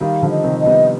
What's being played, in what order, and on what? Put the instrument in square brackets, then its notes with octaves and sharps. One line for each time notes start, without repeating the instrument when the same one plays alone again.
[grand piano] D#3 G3 [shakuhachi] F5
[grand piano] D3 F3
[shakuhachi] D#5
[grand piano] C3 D#3
[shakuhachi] D#5
[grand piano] G3 B3